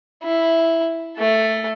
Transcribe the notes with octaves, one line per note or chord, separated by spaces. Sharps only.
E4
A3 A4